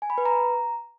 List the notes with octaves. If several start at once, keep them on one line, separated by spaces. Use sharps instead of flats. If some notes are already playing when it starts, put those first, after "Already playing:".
G#5
B5
B4
A#5